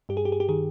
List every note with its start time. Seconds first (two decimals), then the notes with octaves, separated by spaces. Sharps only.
0.09 G2 G4
0.17 G#4
0.25 G4
0.32 G#4
0.40 G4
0.49 D#3 G#4